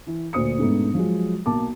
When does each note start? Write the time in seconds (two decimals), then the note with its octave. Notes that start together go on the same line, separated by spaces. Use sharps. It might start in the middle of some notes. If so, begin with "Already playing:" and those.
0.07 E3
0.33 D2 A#2 C5 D#6 C#7
0.58 G#2 B2 A3 B3 C#4 D4
0.94 F3 F#3 G#3
1.46 B1 A#3 A5 D6